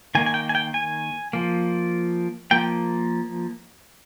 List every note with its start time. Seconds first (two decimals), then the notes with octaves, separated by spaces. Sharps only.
0.15 D#3 A#3 G#5
0.26 G#5
0.34 G5
0.49 G#5
0.55 G5
0.74 G#5
1.33 F3 A#3
2.51 F3 A#3 G5